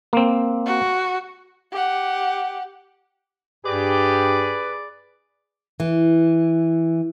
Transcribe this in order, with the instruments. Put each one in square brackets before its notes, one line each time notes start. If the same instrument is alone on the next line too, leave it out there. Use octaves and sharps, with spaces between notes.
[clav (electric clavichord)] A#3 C4
[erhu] F#4
[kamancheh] G4 F#5
[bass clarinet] G2 [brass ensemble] G4 [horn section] G#4 D5 [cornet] B4
[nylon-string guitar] E3